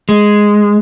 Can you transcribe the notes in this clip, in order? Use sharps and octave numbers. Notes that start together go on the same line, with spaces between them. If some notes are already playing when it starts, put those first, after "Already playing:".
G#3